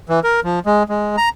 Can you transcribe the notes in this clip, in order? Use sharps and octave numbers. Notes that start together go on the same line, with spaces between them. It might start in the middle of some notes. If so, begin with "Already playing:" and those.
E3
A#4
F3
G#3
G#3
A#5